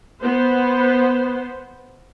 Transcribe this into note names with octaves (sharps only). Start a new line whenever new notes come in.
B3 C5